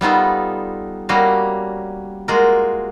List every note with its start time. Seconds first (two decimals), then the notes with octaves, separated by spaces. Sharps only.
0.01 G3 B3 D#4 F4 A4
1.09 G3 A#3 C#4 F#4 D#5 F5
2.28 G#3 A#3 F4 F#4 A#4